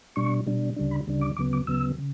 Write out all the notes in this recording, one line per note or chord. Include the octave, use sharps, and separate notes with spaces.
B2 G3 D4 C#6
B2 G3 D4
D2 C#3 G3 D4
B5
D2 C#3 G3 D4
D6
D2 C#3 F#3 B3 D6
D6
D2 C#3 F#3 B3 E6
C#3